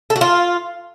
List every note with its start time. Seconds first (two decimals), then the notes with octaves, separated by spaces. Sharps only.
0.10 A4
0.16 F#4
0.21 F4